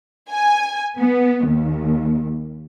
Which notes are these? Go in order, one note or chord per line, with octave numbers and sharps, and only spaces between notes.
G#5
B3
D#2